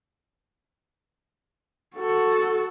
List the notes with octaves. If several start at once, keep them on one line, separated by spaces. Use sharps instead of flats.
F#4 A4